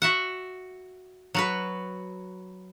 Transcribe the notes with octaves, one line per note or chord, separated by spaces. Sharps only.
F#4 E5 F#5
F#3 F#4 B4